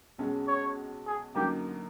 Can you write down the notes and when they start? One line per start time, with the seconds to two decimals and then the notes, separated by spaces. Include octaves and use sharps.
0.18 B1 B2 G#3 C#4
0.48 C#5
1.06 G#4
1.35 F#2 D3 F#3 A#3 D#4 G4